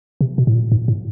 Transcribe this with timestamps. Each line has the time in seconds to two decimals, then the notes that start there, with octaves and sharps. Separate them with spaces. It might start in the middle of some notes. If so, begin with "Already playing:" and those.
0.21 C3
0.38 B2
0.47 A2
0.54 A#2
0.72 G#2
0.88 A2